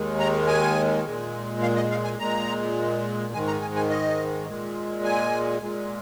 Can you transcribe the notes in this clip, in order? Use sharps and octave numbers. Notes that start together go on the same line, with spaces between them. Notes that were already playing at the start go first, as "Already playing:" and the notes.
Already playing: D#2 D#3 G#3
A#5
G#5
A#2 G#3
F5
D#5
F5
G#5
A#2 G#3 A#5
G#2 D#3 G#3 G#5
A#5
G#5
G#5
D#5
A#2 G#3
G#5
A#2 G#3